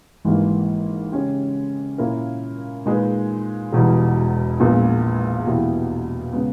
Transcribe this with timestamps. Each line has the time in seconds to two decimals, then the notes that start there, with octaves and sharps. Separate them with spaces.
0.25 G#1 G#2 E3 G3 A#3
1.12 C#3 G#3 C#4 G4
1.98 A#2 A#3 C#4 E4 A#4
2.86 A#2 G#3 D#4 G#4 B4
3.73 E1 E2 B2 G3
4.60 A#1 A#2 G#3 B3
5.46 E2 B2 A#3 E4 G4
6.33 C#3 G#3 B3